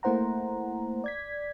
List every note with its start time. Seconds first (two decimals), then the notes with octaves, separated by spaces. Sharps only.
0.03 A3 A#3 E4 C5 F#5 A#5
1.04 D5 G#6 B6